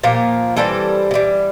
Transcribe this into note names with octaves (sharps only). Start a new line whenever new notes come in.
A#2 F3 A#3 G4
E3 G3 C4 A4
C3
E3 G3